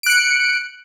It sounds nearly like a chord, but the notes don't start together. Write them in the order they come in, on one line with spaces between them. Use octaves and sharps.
D7 F#6 C#7